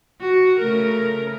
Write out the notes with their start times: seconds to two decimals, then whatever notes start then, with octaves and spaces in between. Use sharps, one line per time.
0.21 F#4
0.60 C#3 A3 A#4